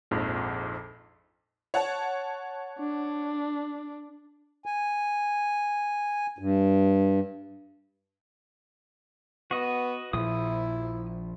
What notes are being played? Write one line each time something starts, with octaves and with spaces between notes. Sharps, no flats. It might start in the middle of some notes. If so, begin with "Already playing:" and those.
A#1 F2 G#2
C#5 F#5 A5
D4
G#5
G2
B3 F#4 D#5
A#1 A#2 F3 E4 D#6